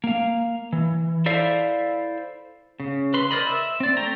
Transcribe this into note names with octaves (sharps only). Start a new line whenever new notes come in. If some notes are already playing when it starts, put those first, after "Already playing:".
A#3 F5
E3
E4 A4 C5 D5 E5 F5
C#3
B4 C6
A#4 C5 D5 D#5 B5
E5
C4 D5
A3 G5 A#5